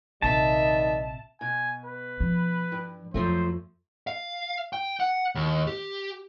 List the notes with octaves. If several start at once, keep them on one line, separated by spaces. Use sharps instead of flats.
A#1 C3 D#3 G3 D#5 E5 A5
B2 G#5
B4
F3
G2
F2 F3 F#3 A3 C5
F5
G5
F#5
D#2
G4